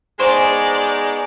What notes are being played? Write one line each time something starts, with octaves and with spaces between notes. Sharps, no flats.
G#3 B3 D#4 C5 D5 G#5 A#5 C#6